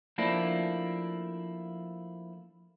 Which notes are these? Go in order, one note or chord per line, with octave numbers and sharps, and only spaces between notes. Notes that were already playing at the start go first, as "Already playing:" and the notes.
F3 A3 A#3 D4 E4